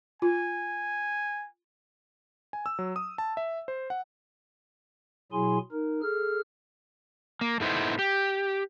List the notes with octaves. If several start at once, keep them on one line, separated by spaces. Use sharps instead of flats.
F4 G#5
G#5
E6
F#3
D#6
A5
E5
C5
F#5
B2 F#3 E4 G#4 G#5 C6
D#4 A#4
G#4 A4 F6
A#3
A2 A3 B3 D#4 E4 C5
G4